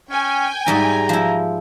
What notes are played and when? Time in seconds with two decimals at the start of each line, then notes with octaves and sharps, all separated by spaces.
0.11 C#4 G5 G#5
0.66 G#2 G3 E4 A#5
1.09 F3 E4